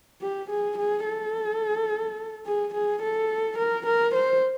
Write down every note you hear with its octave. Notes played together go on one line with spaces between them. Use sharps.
G4
G#4
G#4
A4
G#4
G#4
A4
A#4
A#4
C5